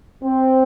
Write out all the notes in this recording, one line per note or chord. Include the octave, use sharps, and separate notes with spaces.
C4